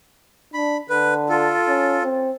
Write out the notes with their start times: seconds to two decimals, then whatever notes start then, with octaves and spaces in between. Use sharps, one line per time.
0.54 D4 B5
0.90 D3 B4
1.29 F4 A4
1.68 C#4
2.04 C4